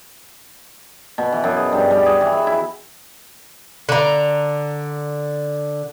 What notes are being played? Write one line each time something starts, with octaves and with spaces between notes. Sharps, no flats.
B2
E3
F#2
G#4
G2
G3
G#4
E3
E5
E4
D3 A#5